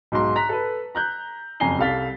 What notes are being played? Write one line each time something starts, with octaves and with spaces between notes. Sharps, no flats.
B1 G#2 A#5 C6
A#5 F#6 B6
A4 B4
A#5 F#6 G6
F#1 F2 G#5 A#5 C7 G7
C2 A4 F5 A6 B6